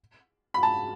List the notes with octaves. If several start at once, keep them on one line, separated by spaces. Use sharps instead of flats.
B5
A5